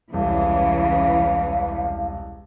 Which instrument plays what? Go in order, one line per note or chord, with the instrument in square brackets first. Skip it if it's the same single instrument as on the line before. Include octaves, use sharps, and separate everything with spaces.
[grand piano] E1 C2 [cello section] C#3 E3 [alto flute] F5